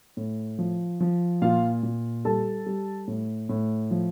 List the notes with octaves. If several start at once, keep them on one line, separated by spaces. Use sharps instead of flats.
A2
F3
F3
A#2 F4 F5
A#2
G3 A4 A5
G3
A2
A2
F3